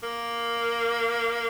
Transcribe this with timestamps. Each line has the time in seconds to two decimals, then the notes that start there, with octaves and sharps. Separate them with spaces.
0.03 A#3